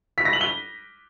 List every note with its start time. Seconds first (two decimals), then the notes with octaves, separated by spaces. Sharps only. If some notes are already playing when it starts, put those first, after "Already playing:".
0.18 B6
0.25 A#6
0.33 F#7
0.41 G7